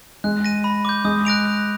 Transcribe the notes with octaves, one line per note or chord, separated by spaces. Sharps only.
G#3 F#6
A#6 D#7
B5
D6 G6
G#3 D#6
F#6 A#6 D7 F7
F#6